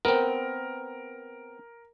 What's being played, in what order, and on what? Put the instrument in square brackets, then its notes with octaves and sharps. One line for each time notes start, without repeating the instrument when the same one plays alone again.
[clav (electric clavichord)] B3 C4 [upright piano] A#4